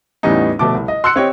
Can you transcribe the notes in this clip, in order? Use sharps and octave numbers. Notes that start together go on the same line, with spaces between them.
E2 A2 G3 B3 C#4 D#4
F1 B2 A3 A5 D6
C2
D#5
C6 E6 F#6 C#7
C4 G4 C#5 D#5 G5